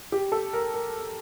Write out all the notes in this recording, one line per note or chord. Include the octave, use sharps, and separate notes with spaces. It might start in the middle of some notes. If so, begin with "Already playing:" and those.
G4
A4
A#4
A#4